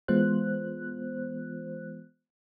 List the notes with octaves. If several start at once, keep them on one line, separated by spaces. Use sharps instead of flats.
E3 G#3 B3 F4 C5 F#6